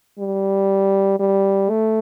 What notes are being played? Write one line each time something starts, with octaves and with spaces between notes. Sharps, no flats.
G3
G3
A3